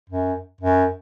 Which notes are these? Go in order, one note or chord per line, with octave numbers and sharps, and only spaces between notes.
F#2
F#2